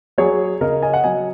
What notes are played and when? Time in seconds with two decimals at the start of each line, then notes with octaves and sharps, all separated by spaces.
0.18 F#3 G#4 C#5
0.61 C#3 A#4 D#5
0.82 D#5 G#5
0.94 F#5
1.03 F#3 D#5 G#5